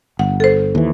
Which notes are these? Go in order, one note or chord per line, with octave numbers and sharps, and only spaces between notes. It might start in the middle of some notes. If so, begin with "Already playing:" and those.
G1 F#5
A4 C5
D#2 E3